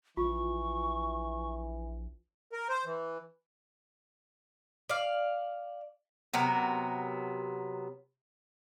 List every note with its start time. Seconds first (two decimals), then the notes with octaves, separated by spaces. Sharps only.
0.17 A#1 E3 F4 C#6
2.53 A#4
2.69 C5
2.86 E3
4.89 D5 F5
6.34 C3 F#3 B3 A#4